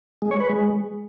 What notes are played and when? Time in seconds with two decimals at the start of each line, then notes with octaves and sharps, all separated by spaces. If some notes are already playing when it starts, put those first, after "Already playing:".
0.22 G#3
0.31 C#5
0.40 B4
0.49 G#3